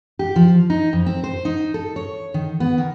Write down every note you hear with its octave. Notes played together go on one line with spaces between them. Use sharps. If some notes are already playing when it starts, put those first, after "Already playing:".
G4
F3
D#4
F2
C4
C5
D#4
A4
C#5
D#3
B3
D#3